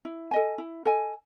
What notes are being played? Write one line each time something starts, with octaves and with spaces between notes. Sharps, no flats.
E4
A4 D#5 G#5
E4
A4 D#5 G#5